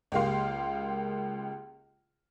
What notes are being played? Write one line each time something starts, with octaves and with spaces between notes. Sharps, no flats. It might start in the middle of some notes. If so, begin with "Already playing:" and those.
C#2 G#3 A#3 G4 F5 C6